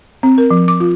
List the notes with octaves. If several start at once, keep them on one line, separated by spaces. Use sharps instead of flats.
C4
A#4
F3
D6
F4